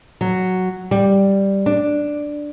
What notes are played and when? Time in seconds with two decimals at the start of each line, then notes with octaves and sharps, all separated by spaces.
0.21 F#3
0.91 G3
1.66 D4